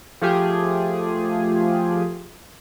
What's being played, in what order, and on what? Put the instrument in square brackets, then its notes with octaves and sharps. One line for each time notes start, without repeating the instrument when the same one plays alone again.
[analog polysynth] F3 A3 F4 G4 G#4